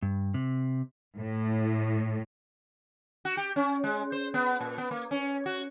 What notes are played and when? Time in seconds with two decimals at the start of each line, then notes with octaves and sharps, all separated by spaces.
0.02 G2
0.34 C3
1.18 A2
3.25 F#4
3.37 G4
3.56 C#4
3.84 G#3
4.12 C5
4.34 B3
4.61 A#2
4.78 B3
4.91 A#3
5.11 C#4
5.46 F#4